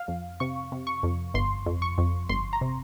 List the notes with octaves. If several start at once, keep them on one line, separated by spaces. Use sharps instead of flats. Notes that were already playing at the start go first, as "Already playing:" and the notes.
Already playing: F5
F2
C3 C#6
C3
C#6
F2
G1 C6
F2
C#6
F2
G1 C6
A#5
C3